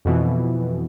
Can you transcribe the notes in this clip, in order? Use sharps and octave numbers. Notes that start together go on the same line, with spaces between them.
F2 B2 E3